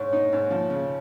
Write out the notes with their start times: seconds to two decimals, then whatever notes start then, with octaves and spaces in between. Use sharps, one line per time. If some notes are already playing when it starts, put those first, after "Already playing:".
Already playing: G#2 C#5
0.13 D#4
0.33 G#2
0.51 F3
0.70 C#3